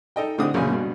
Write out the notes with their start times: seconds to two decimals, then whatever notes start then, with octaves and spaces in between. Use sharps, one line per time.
0.16 D#4 A4 D#5 G5
0.38 A2 D3 C4 E4 G4 D#6
0.54 A#1 F#2 C#3 C#5 G#5
0.70 G2 B2